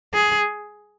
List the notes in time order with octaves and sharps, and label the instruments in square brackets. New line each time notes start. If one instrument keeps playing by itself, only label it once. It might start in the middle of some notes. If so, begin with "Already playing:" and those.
[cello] G#4